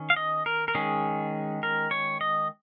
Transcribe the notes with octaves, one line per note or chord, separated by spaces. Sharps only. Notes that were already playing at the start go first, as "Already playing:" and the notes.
Already playing: D#3 C#4
F5
D#5
A#4
A#4
D#3 G#3 C#4 G#4
A#4
C#5
D#5